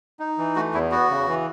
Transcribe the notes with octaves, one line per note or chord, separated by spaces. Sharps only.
D#4
E3
A3 F#4
E2 E4
B3 F#4
C#3
E3